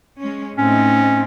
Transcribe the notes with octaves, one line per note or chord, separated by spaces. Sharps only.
G#3 C#4
A2 C4 C#4 D#4